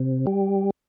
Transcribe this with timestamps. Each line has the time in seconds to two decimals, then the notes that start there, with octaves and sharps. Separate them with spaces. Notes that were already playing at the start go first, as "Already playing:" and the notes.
Already playing: C3
0.27 G3